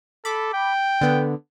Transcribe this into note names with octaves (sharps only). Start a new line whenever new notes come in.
A4 B5 D6
G5
D3 B3